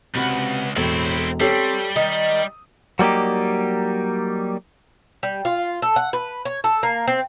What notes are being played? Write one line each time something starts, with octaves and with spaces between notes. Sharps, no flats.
C#2 C3 F#4 B4
E1 A2 C4 E4
G3 C4 G4 A4 C#5
D#3 D#4 D#6
F#3 G3 A#3 D#4 G4
G3
F4
A4
F#5
B4
C#5
A4
A#3
C4